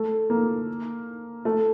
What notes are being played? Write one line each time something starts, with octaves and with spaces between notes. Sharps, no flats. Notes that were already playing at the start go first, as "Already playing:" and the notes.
Already playing: A3
A#3
A3